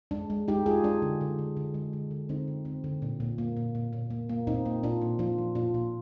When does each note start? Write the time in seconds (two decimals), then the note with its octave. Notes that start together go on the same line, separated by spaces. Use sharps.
0.11 G#3 D4
0.30 G#3
0.48 G#3 D#4 G4
0.66 G#3 F4 G#4
0.84 G#3 D4
1.02 D3
1.21 D3
1.39 D3
1.57 D3
1.74 G#3
1.93 D3
2.11 D3
2.29 D3 C4 D#4
2.48 D3
2.65 D3 C4
2.84 D3
3.02 A#2 D4
3.20 A#2
3.38 A#3
3.57 A#2
3.75 A#2
3.93 A#2
4.10 A#3
4.29 A#3
4.47 A#2 C4 D#4
4.66 A#3
4.83 A#2 D4 F4
5.02 A#2
5.19 F3 D4 F4
5.38 F3
5.55 A#2 D4 F4
5.74 A#2